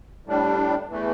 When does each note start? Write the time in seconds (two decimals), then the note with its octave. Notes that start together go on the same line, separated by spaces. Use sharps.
0.25 A2 G3 D4
0.88 E2 E3 A3